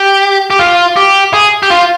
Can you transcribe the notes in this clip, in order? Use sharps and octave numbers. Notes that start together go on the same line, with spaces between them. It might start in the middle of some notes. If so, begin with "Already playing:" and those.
Already playing: G4
G4
F4
G4
G#4
G4
F4